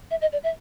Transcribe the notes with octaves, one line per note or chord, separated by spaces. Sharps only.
E5
D#5
D5
E5